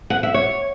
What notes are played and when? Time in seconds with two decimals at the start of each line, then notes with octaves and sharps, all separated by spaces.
0.10 F#5
0.23 E5
0.34 C#5